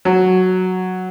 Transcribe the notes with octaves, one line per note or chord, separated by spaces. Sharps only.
F#3